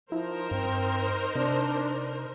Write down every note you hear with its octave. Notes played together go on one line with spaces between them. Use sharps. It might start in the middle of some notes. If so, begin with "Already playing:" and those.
F3 D#4 E4 A#4 C5
G2 C4
C3 D4